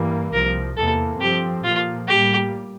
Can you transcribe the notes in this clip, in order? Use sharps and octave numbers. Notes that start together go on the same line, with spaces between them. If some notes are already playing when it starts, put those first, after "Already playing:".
Already playing: G2 E3 G3 A#3
C2 C3 F3 A#4
E2 C3 E3 A#3 A4
G2 F3 C4 G4
A#2 F3 A#3 F4
A2 G3 A#3 G4